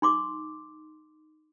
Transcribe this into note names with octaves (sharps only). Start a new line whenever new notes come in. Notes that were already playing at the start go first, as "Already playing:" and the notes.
D#4 C6 D6